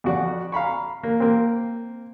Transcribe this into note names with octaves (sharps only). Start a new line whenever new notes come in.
F2 F#4 D5
F5 A#5 B5 C#6
A#3
A#3 C4